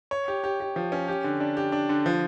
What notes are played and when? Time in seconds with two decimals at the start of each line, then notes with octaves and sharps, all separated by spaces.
0.11 C#5
0.28 G4
0.44 G4
0.60 G4
0.76 F3
0.92 C#4
1.08 G4
1.24 D3
1.40 D4
1.57 G4
1.72 D4
1.89 D3
2.06 F3